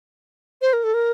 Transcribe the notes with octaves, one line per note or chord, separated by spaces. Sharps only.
C5
A#4
A4
A#4